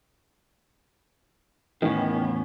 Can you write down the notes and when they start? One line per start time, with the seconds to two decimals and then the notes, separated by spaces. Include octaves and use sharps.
1.82 E2 A2 D#3 E3 B3 C#4